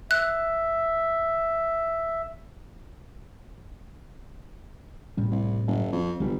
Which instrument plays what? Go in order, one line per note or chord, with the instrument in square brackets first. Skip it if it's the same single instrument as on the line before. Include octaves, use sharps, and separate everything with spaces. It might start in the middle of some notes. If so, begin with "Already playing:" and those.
[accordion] E5 [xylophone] F#6
[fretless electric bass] A2 G3 C#4
[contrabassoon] C2
F#1
F2
[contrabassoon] G1 [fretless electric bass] C#2 F#3 G3